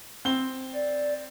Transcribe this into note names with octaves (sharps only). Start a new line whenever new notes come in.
C4 G7
D5